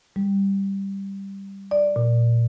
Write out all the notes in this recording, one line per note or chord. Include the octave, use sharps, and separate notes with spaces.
G3
D5
A#2